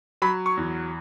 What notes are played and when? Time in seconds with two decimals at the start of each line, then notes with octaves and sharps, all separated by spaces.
0.22 F#3 B5
0.46 C#6
0.57 E2